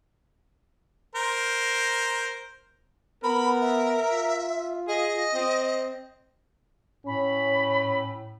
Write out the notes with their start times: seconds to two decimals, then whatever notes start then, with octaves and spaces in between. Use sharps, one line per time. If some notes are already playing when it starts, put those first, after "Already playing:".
1.15 A#4 C5
3.23 B3 A#4 B5
3.61 E5
4.11 F4
4.88 G#4 D#5
5.34 C4
7.06 A2 C#4 B5